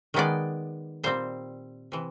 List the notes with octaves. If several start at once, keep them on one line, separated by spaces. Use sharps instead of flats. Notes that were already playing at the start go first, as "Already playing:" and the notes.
D#3 G#3 B3 D5
A#2 G3 C4 C5
C3 E3